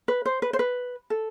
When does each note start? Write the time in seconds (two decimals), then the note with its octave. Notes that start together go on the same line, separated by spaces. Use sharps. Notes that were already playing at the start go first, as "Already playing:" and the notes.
0.08 B4
0.26 C5
0.42 B4
0.53 C5
0.59 B4
1.10 A4